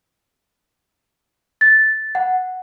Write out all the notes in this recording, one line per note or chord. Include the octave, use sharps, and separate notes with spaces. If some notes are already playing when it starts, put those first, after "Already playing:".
A6
F#5